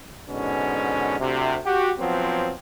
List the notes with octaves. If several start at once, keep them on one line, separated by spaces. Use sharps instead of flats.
G#2 B2 D3 C#4
D2 C3
F#4 G4
F3 F#3 B3 C4